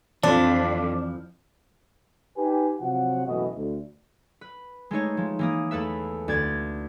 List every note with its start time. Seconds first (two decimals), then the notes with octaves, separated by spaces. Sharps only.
0.23 F2 E3 F3 D4
2.37 D#4 G4 B4 G#5
2.80 C3 F3 F#3 F4 F#4 F#5
3.26 F#1 B2 E3 A3 F#4 D#5
3.55 D2
4.41 B4
4.91 G#3 A3 D#4 C#5
5.17 F3 G#3
5.39 E3 A#3 D#6
5.71 E2 A3 A4 B4 E5
6.28 D2 D5 G#6 A6